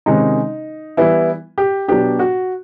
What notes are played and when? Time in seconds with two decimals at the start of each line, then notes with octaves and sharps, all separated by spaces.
0.06 C3 D#3 G#3 C#4 D#4
0.97 E3 G3 B3 E4
1.58 G4
1.88 B2 F#3 B3 D4 G4
2.19 F#4